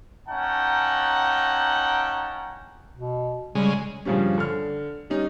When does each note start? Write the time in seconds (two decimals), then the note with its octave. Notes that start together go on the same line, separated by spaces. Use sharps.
0.29 A#3 C#4 D#4 F#5 G5 A5
2.97 B2
3.55 C#3 G3 G#3
4.05 G2 C#3 F3 G3 C#4
4.38 D3 F6
5.10 G3 C#4 D#4